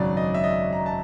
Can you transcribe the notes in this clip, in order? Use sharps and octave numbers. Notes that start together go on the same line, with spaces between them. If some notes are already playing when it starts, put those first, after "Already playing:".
Already playing: G#1 F#2 C#3 F#3 D5
D#5
E5
D#5
A#5
A5